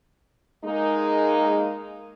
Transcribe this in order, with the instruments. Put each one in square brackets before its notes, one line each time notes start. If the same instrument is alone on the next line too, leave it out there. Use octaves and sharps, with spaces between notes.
[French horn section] G#3 A#3 D#4